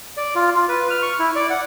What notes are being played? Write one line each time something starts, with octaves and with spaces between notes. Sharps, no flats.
D5
F4
F4
B4
F6
C#6
E4
D5
F#5